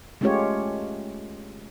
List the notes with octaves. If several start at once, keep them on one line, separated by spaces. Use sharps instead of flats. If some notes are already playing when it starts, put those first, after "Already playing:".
G#3 A3 C#4 F4 G4 C#5